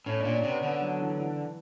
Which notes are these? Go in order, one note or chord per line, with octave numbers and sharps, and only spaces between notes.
A2 C#4
A#2 D4
D4
C3
B3
D3 B3
F#3
E3
E3